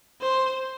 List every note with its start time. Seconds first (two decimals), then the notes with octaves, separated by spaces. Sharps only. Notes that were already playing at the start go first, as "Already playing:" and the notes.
0.21 C5